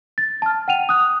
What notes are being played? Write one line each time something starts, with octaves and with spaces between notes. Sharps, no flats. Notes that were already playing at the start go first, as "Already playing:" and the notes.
A6
A5 F6
F#5 G5 D#7 F7
D#6 F#6